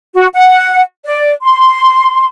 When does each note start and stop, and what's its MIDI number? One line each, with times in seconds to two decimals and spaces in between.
0.15 0.27 66
0.34 0.81 78
1.05 1.31 74
1.43 2.27 84